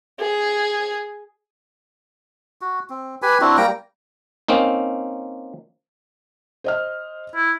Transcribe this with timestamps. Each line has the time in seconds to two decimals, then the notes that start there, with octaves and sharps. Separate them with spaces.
0.20 G#4
2.61 F#4
2.90 C4
3.22 G4 B4 G#5 B5
3.41 C4 D4 E4 F#4
3.57 G3 A#3 G5 A#5
4.48 A#3 C4 C#4 D#4
6.64 C5 D#5 F6
7.36 E4